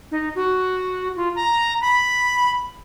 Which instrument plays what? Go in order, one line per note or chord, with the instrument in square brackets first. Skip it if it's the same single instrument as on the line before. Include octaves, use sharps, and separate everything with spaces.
[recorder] D#4
F#4
F4
A#5
B5